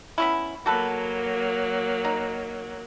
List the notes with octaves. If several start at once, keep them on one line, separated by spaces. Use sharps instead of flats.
B3 C#4 E4
F#3 A#3 F#4 A4 B4
D#4